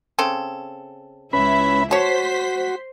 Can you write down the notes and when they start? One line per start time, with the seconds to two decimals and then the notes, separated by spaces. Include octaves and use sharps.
0.19 C#3 C4 A4
1.33 C#2 C#4 E4 B4 E5 B5
1.91 F#4 C5 C#5 A5 C6 B6